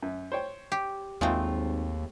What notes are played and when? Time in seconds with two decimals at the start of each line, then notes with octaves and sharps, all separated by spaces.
0.03 F#2
0.32 C5 C#5 G5
0.72 G4
1.21 G#1 D#2 G#3 A3 C4 F4